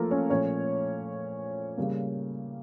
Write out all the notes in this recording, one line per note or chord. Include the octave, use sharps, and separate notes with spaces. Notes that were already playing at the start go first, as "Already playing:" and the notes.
Already playing: F3 A3 A#3 F4 A4 A#4
C#4 C#5
A#2 F3 A3 C#4 C#5
C#3 G3 A#3